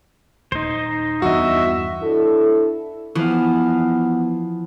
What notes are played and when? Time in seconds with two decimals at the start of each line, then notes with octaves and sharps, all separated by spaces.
0.52 D#1 D#4 C5
1.22 E2 G2 F#4 D#5 E5
2.03 D4 E4 A4
3.15 E3 F3 B3 F5